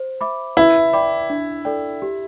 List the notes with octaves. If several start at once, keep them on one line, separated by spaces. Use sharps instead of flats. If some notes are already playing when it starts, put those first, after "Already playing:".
Already playing: C5
E5 B5 D6
E4 B4
D5 G5 B5 D6
D4
A4 D5 G5
G4